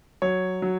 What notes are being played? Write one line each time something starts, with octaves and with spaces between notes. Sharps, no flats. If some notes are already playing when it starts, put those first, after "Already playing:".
F#3 C#5
F#3